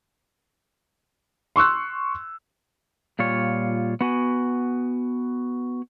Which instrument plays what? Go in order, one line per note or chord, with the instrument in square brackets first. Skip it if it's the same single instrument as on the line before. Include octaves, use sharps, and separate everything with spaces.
[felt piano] C6 C#6 E6 F#6
[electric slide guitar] A#2 G3 F4 C#5
B3 F#4 G#5